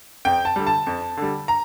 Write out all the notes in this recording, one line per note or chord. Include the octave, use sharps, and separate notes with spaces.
F2 G5
A5
D3 G3
A5
F2
D3 G3
A#5